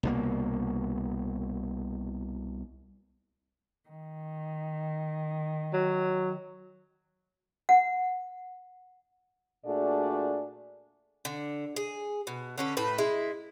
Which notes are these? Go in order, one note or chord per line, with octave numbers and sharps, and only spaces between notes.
C2 B2 A#3
D#3
F#3
F#5
A#2 A3 D4 F#4 G#4 D5
D3
G#4
B2
D3 C#4 B4
A2 B4
G#3 E4